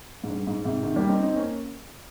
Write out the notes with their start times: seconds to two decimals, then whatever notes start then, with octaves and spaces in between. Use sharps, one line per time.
0.24 G#2
0.29 G2
0.47 G#2
0.65 G#2 C3
0.83 C3 D#3
0.96 G3 A#3
1.09 C4 D#4
1.23 C4 D#4
1.36 A#3 C#4